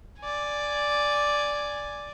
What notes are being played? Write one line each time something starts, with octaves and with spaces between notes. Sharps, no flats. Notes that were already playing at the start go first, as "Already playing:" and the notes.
D5 G#5